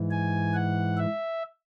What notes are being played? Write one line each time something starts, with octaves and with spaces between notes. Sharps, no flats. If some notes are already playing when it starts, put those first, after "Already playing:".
Already playing: G#2 E3
G#5
F#5
E5